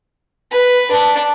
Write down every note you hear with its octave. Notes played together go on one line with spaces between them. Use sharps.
B4
D4